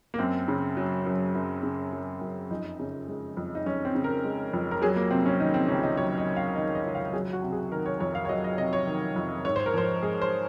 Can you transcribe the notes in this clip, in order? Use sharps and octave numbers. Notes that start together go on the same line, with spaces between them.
A#3
F#2 C4
C#3
F#3
F#2
F#2
C#3
F#3
F#2
F2 D#4
C#3
G#3
F2
D#4
F2 C#4
C4
C#3
A#4
G#3
F2
A#4
F#3 G#4
A#3
C3 C4
C#4
D#3 D#4
C4
C#2 C#4
D#4
F#3 C#5
D#5
C3
F5
D#3 D#5
D#5
C#2
F5
F#3 G#4
F#4
C3
G#4
D#3 A#4
C#5
F2 C#5
F5
C#5
F#3 D#5
D#5
C3 D#5
C#5
D#3
F2
G#2 C#5
C5
A#4
F3 C5
G#3 G#4
C5